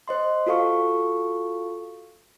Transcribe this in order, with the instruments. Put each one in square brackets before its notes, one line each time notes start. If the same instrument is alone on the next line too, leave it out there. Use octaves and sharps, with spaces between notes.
[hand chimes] C5 D#5 C6
F4 F#4 A4 F5 C#6